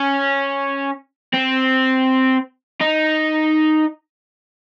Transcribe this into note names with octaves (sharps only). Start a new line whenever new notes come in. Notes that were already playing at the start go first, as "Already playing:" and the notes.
Already playing: C#4
C4
D#4